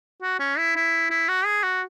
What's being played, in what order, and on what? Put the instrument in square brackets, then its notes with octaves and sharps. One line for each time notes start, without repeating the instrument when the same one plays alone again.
[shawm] F#4
C#4
E4
E4
E4
F#4
G#4
F#4